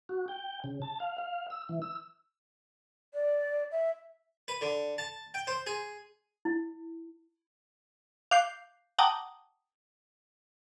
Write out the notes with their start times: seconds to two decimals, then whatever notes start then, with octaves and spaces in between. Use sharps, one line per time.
0.09 F#4
0.28 G5
0.64 C#3
0.82 A5
1.00 F5
1.18 F5
1.50 E6
1.69 E3
1.82 E6
3.14 D5
3.71 E5
4.48 B4
4.61 D3
4.98 A5
5.34 G5
5.47 C5
5.67 G#4
6.45 E4
8.31 F5 D6 F#6 G6 C7
8.99 F#5 G5 A5 A#5 D6 D#6